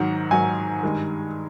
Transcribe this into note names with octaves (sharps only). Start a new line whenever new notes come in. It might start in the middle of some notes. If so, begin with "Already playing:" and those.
Already playing: G#2 D#3 F#3 F#5
G#2 D#3 F#3 G#5
G2 D#3 G#3